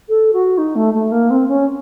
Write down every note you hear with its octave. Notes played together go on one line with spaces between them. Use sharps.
A4
F#4
D#4
A3
A3
A#3
C4
C#4